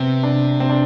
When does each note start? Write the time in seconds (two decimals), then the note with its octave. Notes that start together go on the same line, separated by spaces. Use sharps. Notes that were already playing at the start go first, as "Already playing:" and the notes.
Already playing: C3 B3 C4
0.23 D4
0.60 C4
0.70 D4